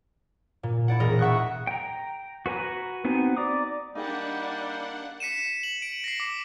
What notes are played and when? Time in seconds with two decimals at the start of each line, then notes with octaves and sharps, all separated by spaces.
0.63 A#2
0.88 E4 D5 F#5
1.00 E1 A#4 D#5
1.19 E5 F#5 C#6 D#6 F#6
1.67 G5 A#5
2.46 F#4 B4 G#5 A#5
3.05 B3 C4 D#4 F#4 G#5
3.37 D5 A#5 D6 D#6
3.95 G3 A#3 D4 D#4 G#4 F#5 G5
5.20 B6 C#7 D#7 E7
5.63 F#7
5.82 D7
6.04 A#6 C7
6.20 D6